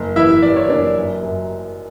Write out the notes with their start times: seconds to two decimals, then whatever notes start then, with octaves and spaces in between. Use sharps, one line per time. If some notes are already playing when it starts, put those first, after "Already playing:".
Already playing: F#1
0.16 E3 E4 E5
0.42 E3 D5
0.56 C#5
0.69 F#1 D4 D5
0.96 F#2
1.23 F#2